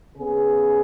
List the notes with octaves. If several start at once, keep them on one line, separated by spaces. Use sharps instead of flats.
C#3 B3 G#4